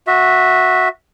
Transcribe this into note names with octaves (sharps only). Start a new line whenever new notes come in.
F#4 E5